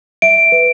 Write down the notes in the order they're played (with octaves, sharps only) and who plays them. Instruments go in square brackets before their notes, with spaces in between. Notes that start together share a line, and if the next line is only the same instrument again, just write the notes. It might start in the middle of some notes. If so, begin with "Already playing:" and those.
[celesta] E5 [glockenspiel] D7
[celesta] B4